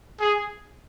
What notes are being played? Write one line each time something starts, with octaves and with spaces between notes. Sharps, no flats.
G#4